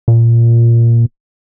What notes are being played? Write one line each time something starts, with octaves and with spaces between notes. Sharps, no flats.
A#2